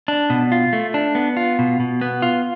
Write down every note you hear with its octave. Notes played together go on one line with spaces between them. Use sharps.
D4
B2
F4
A3
D4
B3
F4
B2
B2
B3
F4